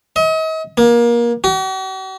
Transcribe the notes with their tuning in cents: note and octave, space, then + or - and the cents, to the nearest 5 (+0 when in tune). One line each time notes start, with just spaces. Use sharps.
D#5 +40
A#3 +25
F#4 +45